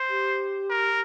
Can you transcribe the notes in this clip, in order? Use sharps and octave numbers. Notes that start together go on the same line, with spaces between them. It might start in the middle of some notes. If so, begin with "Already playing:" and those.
Already playing: C5
G4
A#4